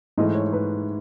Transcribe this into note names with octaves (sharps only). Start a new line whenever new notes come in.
G#2 E3 A3 D#5
C#5
B4